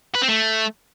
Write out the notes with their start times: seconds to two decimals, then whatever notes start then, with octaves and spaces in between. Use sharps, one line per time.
0.15 B4
0.22 C4
0.29 A3